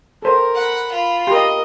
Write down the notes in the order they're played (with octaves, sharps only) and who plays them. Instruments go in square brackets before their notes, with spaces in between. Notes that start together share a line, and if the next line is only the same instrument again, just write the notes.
[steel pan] A4 C5 [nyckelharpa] A#4
[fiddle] F#5 B5
F4 B5
[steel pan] G4 C6 [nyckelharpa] A#4 D#5